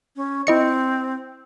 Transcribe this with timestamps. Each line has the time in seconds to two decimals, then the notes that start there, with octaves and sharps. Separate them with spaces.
0.16 C#4
0.47 C4 E4 D#5 C#7